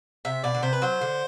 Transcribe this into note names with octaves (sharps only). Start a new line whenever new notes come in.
C3 E5
B2 D5
D3
C3 C5
B4
F#3 C5
D3